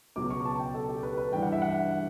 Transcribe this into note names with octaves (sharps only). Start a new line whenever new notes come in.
C#2 B2 F#3 B3 D6
C#6
A5
G5
A4
G4
B4
B4
G2 E3 G3 G5
F#5
E5
F#5